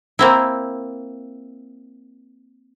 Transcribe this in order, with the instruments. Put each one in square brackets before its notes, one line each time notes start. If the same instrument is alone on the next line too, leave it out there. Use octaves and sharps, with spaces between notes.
[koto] A#3 C4 E4